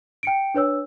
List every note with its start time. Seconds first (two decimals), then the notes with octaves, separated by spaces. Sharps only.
0.23 G5 C#7 D7
0.54 D4 B4 C#5 E6